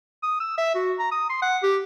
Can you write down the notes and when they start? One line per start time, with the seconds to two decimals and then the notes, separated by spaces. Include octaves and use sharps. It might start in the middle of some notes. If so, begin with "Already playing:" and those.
0.23 D#6
0.40 E6
0.58 E5
0.75 F#4
0.99 A#5
1.12 D#6
1.30 C6
1.42 F#5
1.63 G4